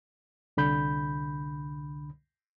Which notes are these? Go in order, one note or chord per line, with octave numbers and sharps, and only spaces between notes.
C2 D3 B5 G6